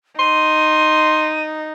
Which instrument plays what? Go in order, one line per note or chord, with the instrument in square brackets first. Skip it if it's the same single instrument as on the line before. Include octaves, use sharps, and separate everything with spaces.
[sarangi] D#4 [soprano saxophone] C6 [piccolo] D#7